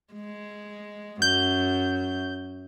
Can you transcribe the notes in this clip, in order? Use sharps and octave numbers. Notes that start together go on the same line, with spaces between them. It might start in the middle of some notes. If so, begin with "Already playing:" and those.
G#3
F#2 G6